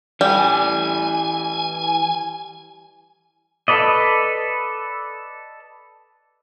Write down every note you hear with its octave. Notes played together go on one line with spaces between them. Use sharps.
E3 G3 A4 G#5
A4 B4 D5 D#5